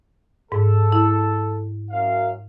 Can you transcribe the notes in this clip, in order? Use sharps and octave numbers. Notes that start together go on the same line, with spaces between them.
G#2 A4
E4
F#2 F5